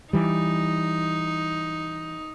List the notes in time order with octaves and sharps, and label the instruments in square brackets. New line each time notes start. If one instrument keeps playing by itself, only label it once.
[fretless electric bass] E3 G3 [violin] D#4